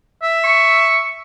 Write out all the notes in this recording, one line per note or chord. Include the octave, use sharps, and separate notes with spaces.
E5
C#6